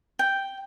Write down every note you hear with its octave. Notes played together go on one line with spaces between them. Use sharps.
G5